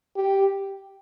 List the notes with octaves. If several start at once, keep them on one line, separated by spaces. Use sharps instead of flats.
G4